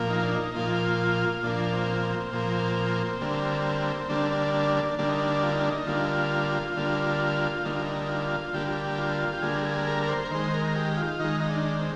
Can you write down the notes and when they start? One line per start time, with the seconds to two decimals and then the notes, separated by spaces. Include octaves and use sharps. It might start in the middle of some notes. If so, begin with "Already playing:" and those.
Already playing: A#2 F3 A#3
0.10 D#4
0.23 D4
0.35 D#4
0.54 A#2 F3 A#3 F4
1.43 A#2 F3 A#3 D4
1.73 C4
2.03 C4
2.32 A#2 F3 A#3
3.21 D3 G3 A#3
4.09 D3 G3 A#3 D4
4.31 D4
4.54 D4
4.77 D4
4.98 D3 G3 A#3 D4
5.09 D#4
5.19 D4
5.43 F4
5.52 D#4
5.60 D4
5.70 D#4
5.87 D3 G3 A#3 F4
6.77 D3 G3 A#3
7.65 D3 G3 A#3 D#4
7.73 F4
7.82 D#4
8.09 F4
8.54 D3 G3 A#3 G4
8.64 F4
8.73 G4
8.98 F4
9.33 G4
9.42 D3 G3 A#3 G#4
9.65 G#4
9.87 A#4
10.03 A#4
10.08 C5
10.24 A#4
10.31 D#3 G#3 C5
10.53 A#4
10.75 G4
10.97 F4
11.19 D#3 G#3 D#4
11.40 D#4
11.50 D4
11.79 C4